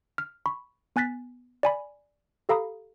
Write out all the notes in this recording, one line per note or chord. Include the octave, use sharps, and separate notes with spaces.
F6
B5 C#6
B3 G#5 F#6 A6 B6
D5 G#5 B5
G4 A4 F5 A#5 B5 D#6